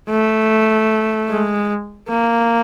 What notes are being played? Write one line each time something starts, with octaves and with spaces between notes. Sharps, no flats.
A3
G#3
A#3